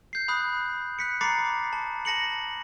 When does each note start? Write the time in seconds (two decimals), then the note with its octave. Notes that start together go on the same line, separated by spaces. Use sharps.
0.13 G6 C7
0.28 B5 D#6 F#6
0.99 F#6 B6 C#7
1.21 A#5 B5 D6 A6 C7 C#7
1.73 A5
2.05 A5 A#6 C#7 F#7